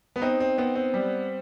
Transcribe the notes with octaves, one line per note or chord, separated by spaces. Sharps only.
B3
C4 D#4
C4
B3 C4
C4
G3